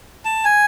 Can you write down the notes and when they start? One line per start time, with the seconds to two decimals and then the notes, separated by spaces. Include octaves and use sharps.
0.25 A5
0.45 G#5